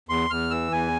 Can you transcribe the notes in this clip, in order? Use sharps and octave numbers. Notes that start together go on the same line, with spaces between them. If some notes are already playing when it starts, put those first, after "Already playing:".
E2 C6
E2 F6
E3 E6
E2 G#5